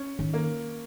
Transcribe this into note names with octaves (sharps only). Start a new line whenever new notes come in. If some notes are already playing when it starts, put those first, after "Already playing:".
Already playing: C#4
D#3
A#3